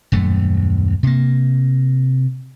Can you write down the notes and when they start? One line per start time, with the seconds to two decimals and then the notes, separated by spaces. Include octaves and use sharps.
0.12 D#1 F#2 A3
1.03 C3 A#3